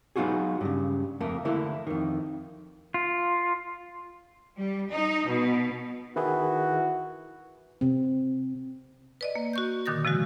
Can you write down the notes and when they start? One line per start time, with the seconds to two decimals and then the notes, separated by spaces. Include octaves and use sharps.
0.16 F#3 B3 D#4 F4 F#4 G#4
0.61 G2 C#3
1.20 F2 A3 A#3
1.45 D3 E3 A3 A#3 E4
1.87 F2 D#3
2.94 F4
4.57 G3
4.90 D#4
5.28 B2
6.16 D#3 E3 E4 F#4 G#4
7.81 C3 C4
9.21 B4 D5 D#5
9.36 A#3
9.53 F#4 C#6 G6
9.86 A#2 D3 D#3 D#6 A6 A#6
10.05 C3 F3 G#3 F#4